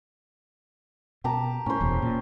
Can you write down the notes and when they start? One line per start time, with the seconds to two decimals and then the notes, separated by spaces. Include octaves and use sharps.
1.24 B2 G4 A5 A#5
1.66 A2 C#4 C5
1.81 D1 E2 B2
2.02 A#2